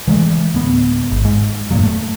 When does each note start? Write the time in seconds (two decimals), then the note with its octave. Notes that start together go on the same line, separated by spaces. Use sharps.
0.08 E3 F#3 G#3 A3
0.54 D1 D2 B3
1.11 G#1
1.25 G#2
1.71 F1 G2 A#2 F#3
1.83 A3